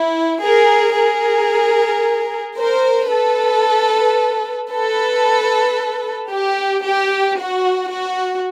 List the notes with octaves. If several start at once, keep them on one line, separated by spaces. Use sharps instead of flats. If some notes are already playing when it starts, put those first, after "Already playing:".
Already playing: E4
G#4 A#4
G#4 A#4
A#4 C5
A4 B4
A4 B4
G4
G4
F#4
F#4